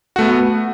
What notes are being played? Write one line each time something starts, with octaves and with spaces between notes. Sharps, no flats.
A3 B3 F#4